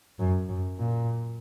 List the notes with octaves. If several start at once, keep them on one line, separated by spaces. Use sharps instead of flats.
F#2
F#2
A#2